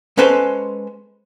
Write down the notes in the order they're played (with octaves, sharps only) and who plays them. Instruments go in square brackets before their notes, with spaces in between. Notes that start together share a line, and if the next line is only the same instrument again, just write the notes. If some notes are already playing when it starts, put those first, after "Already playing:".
[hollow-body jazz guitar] G#3 C#4 A4 B4 C5 A5